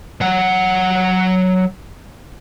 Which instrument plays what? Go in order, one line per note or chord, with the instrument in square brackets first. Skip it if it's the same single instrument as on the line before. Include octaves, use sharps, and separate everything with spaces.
[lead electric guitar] F#3 F#5